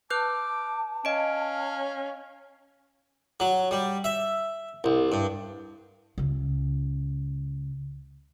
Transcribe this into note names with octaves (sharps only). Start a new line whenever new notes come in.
B4 A5 D6 F#6 G6
C#4 D#5 F5 D7
F#3
G3
E5
C2
G2
C#2 C#3